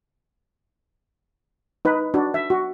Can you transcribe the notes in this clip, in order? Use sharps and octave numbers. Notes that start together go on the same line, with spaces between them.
D#4 B4
D4 F#4
E5
F#4